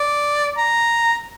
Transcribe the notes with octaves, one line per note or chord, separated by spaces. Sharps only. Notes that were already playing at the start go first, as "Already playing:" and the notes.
Already playing: D5
A#5